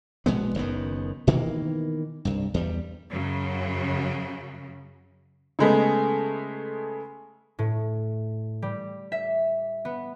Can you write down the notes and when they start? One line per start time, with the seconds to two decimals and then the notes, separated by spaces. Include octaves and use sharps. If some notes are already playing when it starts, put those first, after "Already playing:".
0.26 A#1 B2 G#3 B3
0.55 F#1 F#2 D#3 B3
1.27 B2 D#3 E3 A#3
2.25 C2 G2
2.54 E2 G3
3.11 F#2 C#3 F#3
5.59 C#3 G#3 A3 B3
7.59 A2
8.62 G3
9.12 E5
9.85 B3